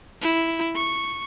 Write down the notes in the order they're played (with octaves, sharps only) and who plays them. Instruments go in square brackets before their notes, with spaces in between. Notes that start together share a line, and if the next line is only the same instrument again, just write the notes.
[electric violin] E4
C#6